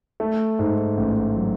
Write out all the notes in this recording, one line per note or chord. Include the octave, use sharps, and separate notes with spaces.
A3
G#2
A1
F#3